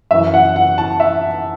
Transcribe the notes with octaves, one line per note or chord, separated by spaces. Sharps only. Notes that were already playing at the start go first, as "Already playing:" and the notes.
F#2 E3 E5
F#5
F#5
A5
E5